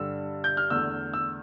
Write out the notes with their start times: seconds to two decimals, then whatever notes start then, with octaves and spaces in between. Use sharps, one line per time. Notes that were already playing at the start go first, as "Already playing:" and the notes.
Already playing: G2 D3 G3 E6
0.44 G6
0.57 F6
0.70 E2 D3 A3 E6
1.14 E6